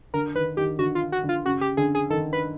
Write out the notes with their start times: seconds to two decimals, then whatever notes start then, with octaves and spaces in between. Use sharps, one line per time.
0.14 D3 A#4
0.35 D#3 B4
0.57 D#3 G4
0.79 D3 F#4
0.95 F4
1.12 F#4
1.23 D3
1.29 F4
1.45 C#3 F#4
1.61 G4
1.77 D3 G#4
1.95 G#4
2.10 D#3 A4
2.33 B4